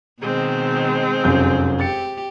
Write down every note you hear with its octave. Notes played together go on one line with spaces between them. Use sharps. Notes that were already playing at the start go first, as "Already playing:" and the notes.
B2 D#3 G#3 C4
F1 F#2 G6
G4 A6 C#7